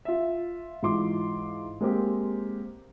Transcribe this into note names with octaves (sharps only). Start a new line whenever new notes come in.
F4 E5
G#2 E3 F4 C6 D6
G#3 A#3 C4 G4